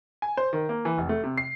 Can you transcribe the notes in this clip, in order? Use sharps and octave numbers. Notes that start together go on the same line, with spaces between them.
G#5
C5
D#3
A#3
E3
F1
A3
C3
C7